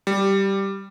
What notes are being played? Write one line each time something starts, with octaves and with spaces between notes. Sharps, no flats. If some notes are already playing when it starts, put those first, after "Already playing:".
G3